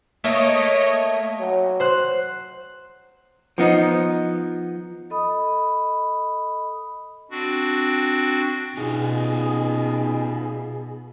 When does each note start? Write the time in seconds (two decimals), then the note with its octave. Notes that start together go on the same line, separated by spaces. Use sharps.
0.24 A3 A#3 C#5 D#5
1.40 F#3
1.80 C5 F#6
3.58 F3 B3 D#4
5.10 A4 D#5 B5 D#6
7.31 C4 D4 F#4
8.77 B2 D#4 F4 G#4